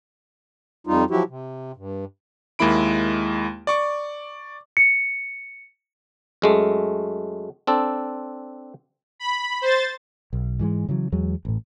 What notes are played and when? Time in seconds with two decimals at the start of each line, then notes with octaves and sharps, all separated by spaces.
0.87 F2 G3 D#4 F4
1.10 F3 F#3 E4 F#4 G4
1.29 C3
1.76 G2
2.59 D#2 G#3 A#3 E4 B5 D7
3.67 D5 C#6 D6
4.77 C#7
6.42 F#2 G#3 A3
7.67 C4 D4 A4
9.20 B5
9.61 C5 A6
10.33 B1
10.59 G#2 E3 F#3 G#3
10.89 C#3 E3 F#3
11.12 E2 F#3 G#3
11.45 A1 A2